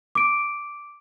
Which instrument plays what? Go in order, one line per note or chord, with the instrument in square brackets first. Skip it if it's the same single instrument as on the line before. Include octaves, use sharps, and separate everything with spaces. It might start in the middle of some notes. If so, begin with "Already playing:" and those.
[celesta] D6 D7